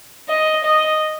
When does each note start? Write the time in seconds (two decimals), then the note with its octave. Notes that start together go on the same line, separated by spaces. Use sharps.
0.29 D#5
0.65 D#5